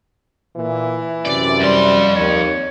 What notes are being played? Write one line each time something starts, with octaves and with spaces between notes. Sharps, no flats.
A#2 E3
F#2 C3 D5
F2 G3 C6
D#2 C#5